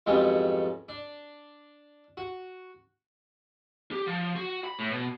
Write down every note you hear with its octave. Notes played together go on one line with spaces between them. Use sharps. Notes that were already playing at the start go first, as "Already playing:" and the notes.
F2 G#2 F#3 G3 B3 C#4
D4
F#4
G4
F3
F#4
B5
A2
B2